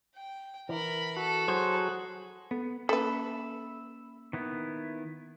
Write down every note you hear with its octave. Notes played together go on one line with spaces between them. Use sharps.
G5
E3 A#4 B5
F#4 A4
F#3 F#4 G#4 C5
B3 A4
A#3 C#4 A4 B4 E5 B5
D#3 B3 E4